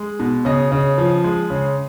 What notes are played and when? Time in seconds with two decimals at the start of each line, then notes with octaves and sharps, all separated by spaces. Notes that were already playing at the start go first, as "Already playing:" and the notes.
Already playing: G#3
0.20 B2
0.45 C#3 D#5
0.72 C#3
0.98 F3
1.24 G#3
1.50 C#3